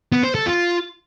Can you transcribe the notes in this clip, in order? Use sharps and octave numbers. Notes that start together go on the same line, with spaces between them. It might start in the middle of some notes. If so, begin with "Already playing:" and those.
B3
C5
A4
F4